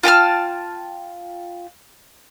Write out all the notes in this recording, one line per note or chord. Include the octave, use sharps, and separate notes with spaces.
F4 G5 A5 F6